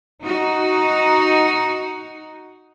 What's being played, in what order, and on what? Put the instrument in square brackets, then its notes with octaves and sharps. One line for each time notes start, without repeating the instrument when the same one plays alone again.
[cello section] D#4 F#4